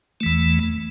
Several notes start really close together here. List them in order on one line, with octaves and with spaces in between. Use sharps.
A3 E3 E2